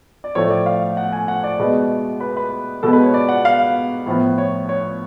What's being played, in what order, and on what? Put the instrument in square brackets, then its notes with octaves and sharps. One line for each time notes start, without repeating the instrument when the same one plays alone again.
[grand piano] D5
A2 F3 A3 C#5
D5
F5
F#5
G#5
F#5
D5
B2 G#3 B3
B4
B4
B2 G#3 B3 A4
B4
C#5
D5
F#5
F5
A2 F3 B3
C#5
C#5